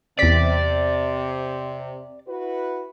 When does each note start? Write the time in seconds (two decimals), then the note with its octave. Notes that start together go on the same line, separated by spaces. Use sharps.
0.19 E2 C3 D5 B6
2.27 E4 F#4 B4